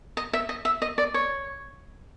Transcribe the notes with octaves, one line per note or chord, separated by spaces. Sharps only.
D#5
E5
D#5
E5
D#5
D5
C#5